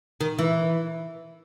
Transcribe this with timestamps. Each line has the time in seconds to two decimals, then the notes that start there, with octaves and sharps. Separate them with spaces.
0.21 D#3
0.39 E3